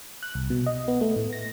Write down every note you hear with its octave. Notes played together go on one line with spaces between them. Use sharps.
F#6
C2
B2
D#5
B3
A3
A2
A#6